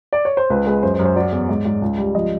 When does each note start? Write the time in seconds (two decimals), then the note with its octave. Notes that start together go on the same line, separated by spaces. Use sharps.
0.13 D5
0.25 C#5
0.37 C5
0.50 C#2 B4
0.66 G#3 B4
0.83 F#2 C5
0.94 C5
0.99 F#2
1.05 C5
1.16 F#3 D5
1.32 E2
1.49 G#2
1.65 G#2
1.82 C#2
1.98 G3
2.14 F3 D#5